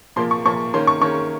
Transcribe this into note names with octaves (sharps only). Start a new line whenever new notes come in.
A#2 F3 A#3 C6
C#6
A#2 F3 A#3 C#6
D#3 A#3 C#4 C6
C#6
D#3 A#3 C#4 C#6